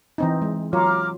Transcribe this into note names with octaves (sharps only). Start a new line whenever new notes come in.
E3 C4 D#4
G#3
F#3 F4 C#5 A#5 D6 F6